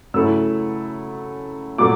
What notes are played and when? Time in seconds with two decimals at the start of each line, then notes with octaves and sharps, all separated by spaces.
0.14 C#3 F#3 A3 C#4 E4 E6
1.78 A#2 F#3 A3 D6